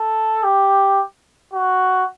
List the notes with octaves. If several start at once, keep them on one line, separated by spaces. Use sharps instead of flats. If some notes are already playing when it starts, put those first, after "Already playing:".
Already playing: A4
G4
F#4